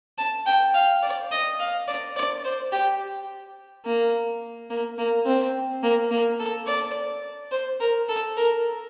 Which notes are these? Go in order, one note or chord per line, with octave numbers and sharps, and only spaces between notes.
A5
G5
F5
D5
D#5
F5
D5
D5
C5
G4
A#3
A#3
A#3
C4
A#3
A#3
A4
D5
C5
A#4
A4
A#4